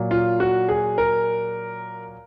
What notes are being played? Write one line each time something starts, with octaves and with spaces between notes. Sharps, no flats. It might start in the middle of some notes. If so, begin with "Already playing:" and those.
Already playing: A#2 F#3
F4
F#4
G#4
A#4